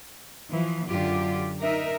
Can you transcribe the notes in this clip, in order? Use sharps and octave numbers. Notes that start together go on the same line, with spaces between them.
E3 F3
F#2 D3 F4 G4
D#4 A#4 E5